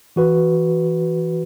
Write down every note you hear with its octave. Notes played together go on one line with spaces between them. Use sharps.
E3 F#4 B4